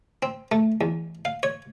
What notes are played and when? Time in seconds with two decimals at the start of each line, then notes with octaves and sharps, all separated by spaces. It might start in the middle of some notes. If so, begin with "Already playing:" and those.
0.23 C4
0.52 A3
0.81 E2
1.25 F5
1.43 C#5